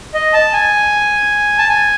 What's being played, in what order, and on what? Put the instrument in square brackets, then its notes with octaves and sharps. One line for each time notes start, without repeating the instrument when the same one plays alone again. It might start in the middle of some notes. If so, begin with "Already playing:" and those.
[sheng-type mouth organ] D#5
A5
G#5
A5
G#5